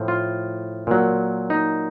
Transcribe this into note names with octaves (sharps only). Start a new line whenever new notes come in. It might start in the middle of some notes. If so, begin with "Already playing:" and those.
Already playing: A2 F3
F4
A#2 F#3
D#4